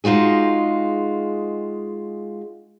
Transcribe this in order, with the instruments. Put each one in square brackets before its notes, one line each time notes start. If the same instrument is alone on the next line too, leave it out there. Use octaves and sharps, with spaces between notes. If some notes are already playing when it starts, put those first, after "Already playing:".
[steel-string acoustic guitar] G#3 D#4 F4 F#4 G#4